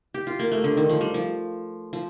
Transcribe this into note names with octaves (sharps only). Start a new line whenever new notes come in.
G4
F4
A#3
A3
D3
D#3
F3
G3
F3
F3